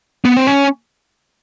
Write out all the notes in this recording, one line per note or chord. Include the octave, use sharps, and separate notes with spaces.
B3
C4
C#4